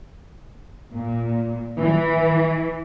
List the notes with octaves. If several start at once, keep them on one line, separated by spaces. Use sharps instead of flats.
A#2
E3